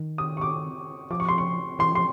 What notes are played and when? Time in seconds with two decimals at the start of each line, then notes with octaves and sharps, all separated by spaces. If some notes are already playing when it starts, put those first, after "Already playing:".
Already playing: D#3
0.18 D#6
0.37 C#6
0.41 D6
1.11 F3 D6
1.20 C#6
1.29 C6
1.38 C#6
1.79 E3 C6
1.93 F3 C6